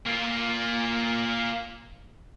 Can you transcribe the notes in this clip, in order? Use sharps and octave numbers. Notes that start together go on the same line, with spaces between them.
A#3 F4